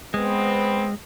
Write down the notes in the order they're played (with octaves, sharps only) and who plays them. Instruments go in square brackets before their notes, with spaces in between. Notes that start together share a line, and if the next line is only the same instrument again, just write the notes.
[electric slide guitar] G#3 [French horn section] B3 C4